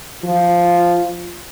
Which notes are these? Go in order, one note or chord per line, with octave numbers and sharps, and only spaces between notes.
F3 F4